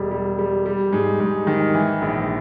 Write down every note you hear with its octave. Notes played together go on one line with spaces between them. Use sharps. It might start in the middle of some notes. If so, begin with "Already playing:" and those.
Already playing: E1 G3
G3
G3
G3
G#2
G#2
D#3
E3
A#1